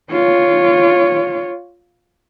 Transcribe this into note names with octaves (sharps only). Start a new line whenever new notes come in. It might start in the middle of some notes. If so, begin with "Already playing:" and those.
F4 C#5